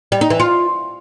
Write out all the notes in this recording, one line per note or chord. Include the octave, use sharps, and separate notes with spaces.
G3
D#4
E3
F4